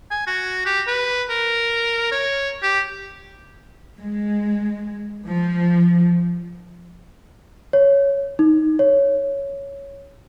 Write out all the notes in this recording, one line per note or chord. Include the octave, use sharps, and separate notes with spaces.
G#5
F#4
G4
B4
A#4
C#5
G4
G#3
F3
C#5
D#4
C#5